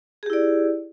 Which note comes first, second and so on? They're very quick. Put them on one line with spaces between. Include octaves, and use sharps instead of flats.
G#4 G4 E4 D5